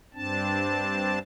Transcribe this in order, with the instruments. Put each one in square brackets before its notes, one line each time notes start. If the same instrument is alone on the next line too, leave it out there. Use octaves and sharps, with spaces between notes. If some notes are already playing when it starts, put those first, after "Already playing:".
[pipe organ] G2 C4 D4 A5